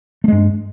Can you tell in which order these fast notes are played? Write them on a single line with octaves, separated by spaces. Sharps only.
A3 G#3 G2